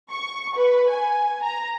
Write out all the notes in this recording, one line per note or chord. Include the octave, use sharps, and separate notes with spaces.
C#6
B4
G#5
A#5